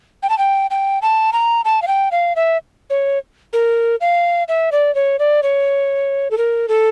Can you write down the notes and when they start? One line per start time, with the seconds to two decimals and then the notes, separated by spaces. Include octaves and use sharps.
0.23 G5
0.29 A5
0.38 G5
0.70 G5
1.02 A5
1.33 A#5
1.65 A5
1.82 F5
1.87 G5
2.12 F5
2.36 E5
2.90 C#5
3.53 A#4
4.01 F5
4.48 E5
4.72 D5
4.95 C#5
5.19 D5
5.43 C#5
6.31 A4
6.38 A#4
6.68 A4